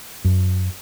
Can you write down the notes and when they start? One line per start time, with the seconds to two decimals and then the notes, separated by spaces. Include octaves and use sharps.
0.25 F#2